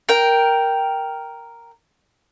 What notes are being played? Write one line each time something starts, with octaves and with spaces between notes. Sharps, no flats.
A#4 G5